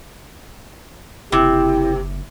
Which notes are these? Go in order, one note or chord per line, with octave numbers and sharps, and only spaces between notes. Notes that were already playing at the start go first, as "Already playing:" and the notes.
F#1 C3 E4 G4